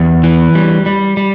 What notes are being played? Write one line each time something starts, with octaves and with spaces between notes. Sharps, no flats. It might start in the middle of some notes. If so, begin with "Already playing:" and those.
Already playing: E2 G4
E3
G3
G3
G3